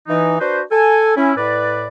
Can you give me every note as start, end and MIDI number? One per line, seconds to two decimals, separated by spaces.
0.07 0.35 52
0.07 0.35 63
0.40 0.60 62
0.40 0.60 66
0.40 0.60 71
0.40 0.60 72
0.71 1.15 69
0.71 1.15 80
1.16 1.32 61
1.16 1.32 64
1.36 1.87 45
1.36 1.87 71
1.36 1.87 74